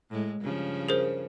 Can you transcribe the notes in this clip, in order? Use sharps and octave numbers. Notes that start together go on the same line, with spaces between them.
A2 G#3
G2 C#3 F3
G#4 A#4 C5